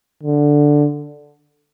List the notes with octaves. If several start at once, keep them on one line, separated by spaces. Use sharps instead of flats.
D3